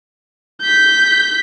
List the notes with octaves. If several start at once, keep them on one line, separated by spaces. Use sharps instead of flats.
G6 B6